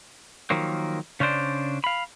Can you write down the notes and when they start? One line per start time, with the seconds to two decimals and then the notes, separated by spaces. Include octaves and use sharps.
0.50 D#3 F3 F#3 A#3
1.20 C#3 C#4 D4 C5 D5
1.84 F5 B5